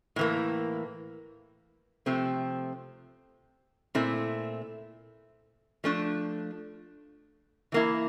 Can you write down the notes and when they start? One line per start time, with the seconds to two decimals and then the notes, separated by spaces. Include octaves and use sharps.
0.16 A2 E3 A#3
2.06 C3 F3 A3 C4
3.95 A#2 A3 C4 E4
5.84 F3 A3 D4
7.72 E3 A#3 E4